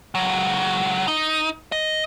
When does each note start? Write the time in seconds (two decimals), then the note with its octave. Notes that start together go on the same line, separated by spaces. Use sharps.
0.15 C#2 F#3
1.08 D#4
1.72 D#5